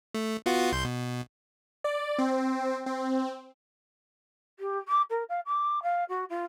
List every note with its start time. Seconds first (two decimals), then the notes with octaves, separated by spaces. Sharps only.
0.14 A3
0.46 B3 F4 F#4
0.72 C2 C6 G6
0.85 B2
1.84 D5
2.18 C4
2.86 C4
4.59 G4
4.88 D6
5.10 A#4
5.29 F5
5.46 D6
5.83 F5
6.09 F#4
6.29 F4